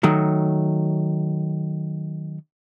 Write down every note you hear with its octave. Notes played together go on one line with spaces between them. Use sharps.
D#3 F#3 A3